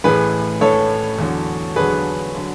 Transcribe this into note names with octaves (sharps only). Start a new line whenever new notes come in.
A1 A2 E3 G#4 B4
A1 A2 E3 A4 C#5
E2 D3 F#3
E2 D3 F#3 G#4 B4
D3 F#3